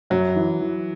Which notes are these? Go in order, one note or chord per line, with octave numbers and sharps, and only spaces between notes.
F#2 F#3
E3
E3